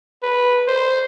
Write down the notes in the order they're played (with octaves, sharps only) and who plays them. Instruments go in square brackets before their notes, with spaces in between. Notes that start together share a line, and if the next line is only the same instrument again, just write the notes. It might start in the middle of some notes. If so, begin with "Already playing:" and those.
[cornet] B4
C5